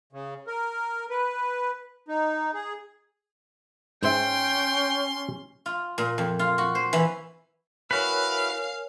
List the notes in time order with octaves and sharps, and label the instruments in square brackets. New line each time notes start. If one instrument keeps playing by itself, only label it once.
[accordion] C#3
A#4
B4
D#4
G#4
[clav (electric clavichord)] G#2 C5 E5 [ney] C#4 [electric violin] G5 [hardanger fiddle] C6
[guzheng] F4
A#2
F2
F4
F#4
C5
E3
[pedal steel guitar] E4 F#4 B4 [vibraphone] A#4 C#5 G#5 [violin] F5